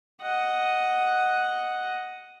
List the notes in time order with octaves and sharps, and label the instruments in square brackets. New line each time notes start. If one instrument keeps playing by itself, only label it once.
[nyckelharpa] D#5 F#5